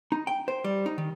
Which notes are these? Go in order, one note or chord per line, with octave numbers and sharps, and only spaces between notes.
D#4
G5
C5
G3
D#4
D#3